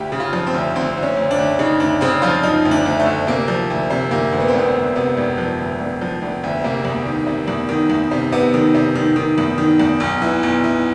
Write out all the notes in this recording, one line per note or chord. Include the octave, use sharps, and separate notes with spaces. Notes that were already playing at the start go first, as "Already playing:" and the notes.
Already playing: D2 G4
C#3
F4
F3
C4
D2
D2 C4
D2
C#4
D2
D4
D2
C#3 D#4
D2 D4
C#3 C4
F3 F4
F3 D#4
D2
D4
D2
A3
D2
C3 A#3
F3
D2
C3
D2 A#3
D2
B3
C4
E1 B3
D2
C3 B3
E1
F3
D2
E1
F3
E1
D2
C3 A#3
E2
D#3
C3
E2
D#3
E2
C3
C3 B3
D#3
C3
D#3
D#3
E2
D#3
E2
B1
E3
B1
E3